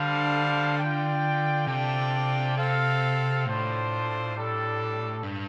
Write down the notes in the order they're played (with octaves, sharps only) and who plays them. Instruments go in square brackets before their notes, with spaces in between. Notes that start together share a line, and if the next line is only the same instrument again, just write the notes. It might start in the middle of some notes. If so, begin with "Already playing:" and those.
Already playing: [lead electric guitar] D3 [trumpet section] G3 D4 A4 C5 F5
[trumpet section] F4 D5 G5
[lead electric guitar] C3 [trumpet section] D4 F4 A4 D5 G5
[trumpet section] C4 A4 F5
[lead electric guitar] A2 [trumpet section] D4 F4 A4 C5
[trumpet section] G3 D4 A4
[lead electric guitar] G2